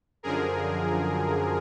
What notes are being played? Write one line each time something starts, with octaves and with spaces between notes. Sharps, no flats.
F#2 D3 F3 G#4 A#4